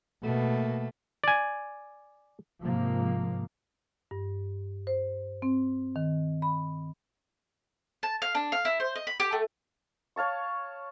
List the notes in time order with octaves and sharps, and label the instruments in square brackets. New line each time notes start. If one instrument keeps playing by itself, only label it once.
[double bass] B2 [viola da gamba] A3 A#3
[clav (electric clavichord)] D5 G#5
[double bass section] G#2 C3 F3 A#3
[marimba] G2
C5
C4
D#3
B5
[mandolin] A5
F5
D4
F5
E4
C5
D#5
B5
G4
A3
[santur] C#5 F5 A5 C#6